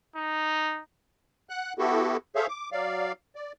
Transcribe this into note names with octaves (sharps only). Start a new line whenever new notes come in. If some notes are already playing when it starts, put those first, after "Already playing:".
D#4
F#5 F#6
B3 E4 F#4 G4 A4
G#4 A4 C5 C#5 E5 F5
D6
F#3 D5 F5
D5